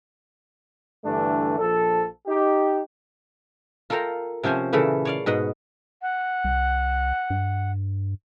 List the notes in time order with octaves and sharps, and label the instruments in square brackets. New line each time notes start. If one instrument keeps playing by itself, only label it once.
[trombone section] G2 D3 E3 A3 D4
A#1 F3 A4
D#4 G4
[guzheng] F4 A4 A#4 F5 G5 A#5
C3 F3 C#4 C5 G#5
A#2 C#3 E3 A3 A4
C#5 D5 F5
G#2 B2 D#5 F#5
[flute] F#5
[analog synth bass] C2
G2